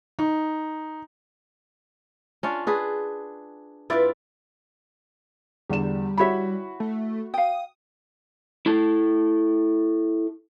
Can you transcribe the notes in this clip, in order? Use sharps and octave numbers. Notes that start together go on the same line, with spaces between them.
D#4
C#4 D4 F4
D4 G#4 B4
G2 C4 E4 F4 B4 D5
E2 D3 G3 E7
E4 F#4 C#5 E5 B5
A3
F5 G5 D#6
E4 A4 A5